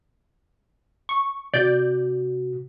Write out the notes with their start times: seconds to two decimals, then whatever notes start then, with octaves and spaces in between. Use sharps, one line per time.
1.09 C#6
1.54 C3 F#4 D5 G6